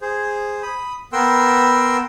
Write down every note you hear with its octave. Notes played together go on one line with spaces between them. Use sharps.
G#4 C5
B5 D#6
B3 A#4 B4 G5 C6 E6